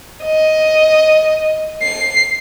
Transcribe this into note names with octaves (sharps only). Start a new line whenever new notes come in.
D#5
C7